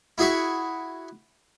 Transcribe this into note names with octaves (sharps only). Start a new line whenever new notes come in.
E4 F#4 G#4 E5 C#6